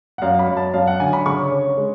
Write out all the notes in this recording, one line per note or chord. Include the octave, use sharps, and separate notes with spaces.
F#5
F#2 F5
B5
F#2
A5
F#2 F5
F#5
D3 G#5
B5
C#3 C#6
C#4
G#3